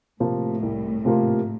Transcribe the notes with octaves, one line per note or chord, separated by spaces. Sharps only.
A2 C3 F3 A#3 F4
C2
C3 F3 A#3 F4